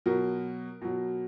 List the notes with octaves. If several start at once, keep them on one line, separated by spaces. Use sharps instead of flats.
B2 F#3 A#4
B2 F#3